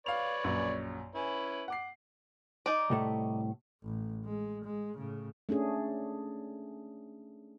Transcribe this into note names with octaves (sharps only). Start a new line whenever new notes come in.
B4 C#5 D5 F5 F7
A#1 F#2
C#4 E4 B4 G#5
F#5 D6 C7
D#4 D5
C2 A2 A3
A1
G#3
G#3
A2 C#3
A3 C#4 D4 G#4